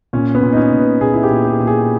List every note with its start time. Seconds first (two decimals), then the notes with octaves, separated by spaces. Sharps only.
0.13 A#2 C#4
0.35 B3
0.42 A#2
0.53 D#4
0.57 C#4
0.72 A#2
0.79 B4
1.01 A#2 G#4
1.14 E4
1.23 G4
1.30 A#2
1.45 G4
1.60 A#2
1.67 G#4